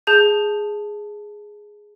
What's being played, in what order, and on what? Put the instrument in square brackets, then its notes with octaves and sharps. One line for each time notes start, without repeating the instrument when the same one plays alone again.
[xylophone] G#4 A5 G6